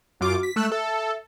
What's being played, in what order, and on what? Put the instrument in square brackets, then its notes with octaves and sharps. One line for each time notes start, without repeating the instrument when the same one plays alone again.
[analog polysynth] F#2 F4 D6 [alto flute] F#4
[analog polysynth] B6
[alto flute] G#3 [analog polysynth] A3 E6 F#6
[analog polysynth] A4 [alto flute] E5